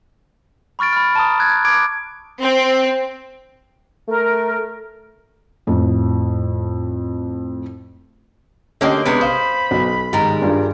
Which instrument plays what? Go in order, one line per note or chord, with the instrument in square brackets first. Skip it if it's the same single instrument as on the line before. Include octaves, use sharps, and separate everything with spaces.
[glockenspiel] B5 C#6 F6 A6 D7
B5 F6
A5 A#5 D#6
F#6 G#6
D6 G#6 D7
[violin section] C4
[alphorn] A3 [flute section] A#4
[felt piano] F2 A2
[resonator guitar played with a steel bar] D3 A#3 G4 [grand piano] A3 [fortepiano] C#4 D#5
[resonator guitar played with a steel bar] C3 G#3 D4 [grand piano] B3 [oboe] B5
[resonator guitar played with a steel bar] C5 [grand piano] F5 D#6
[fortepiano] B1
[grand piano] G#2 D#3 [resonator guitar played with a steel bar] G3 A#4
[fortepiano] G2 [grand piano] F4 G#4